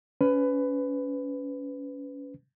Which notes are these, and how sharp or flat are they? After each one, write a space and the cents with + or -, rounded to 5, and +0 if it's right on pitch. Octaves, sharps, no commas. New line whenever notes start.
C#4 +25 B4 +20